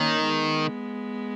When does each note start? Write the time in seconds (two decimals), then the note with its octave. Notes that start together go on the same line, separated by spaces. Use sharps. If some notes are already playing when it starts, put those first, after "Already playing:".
Already playing: D#3 A#3 C#4
0.29 G#3 B3